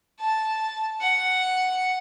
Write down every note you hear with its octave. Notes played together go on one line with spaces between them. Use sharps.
A5
F#5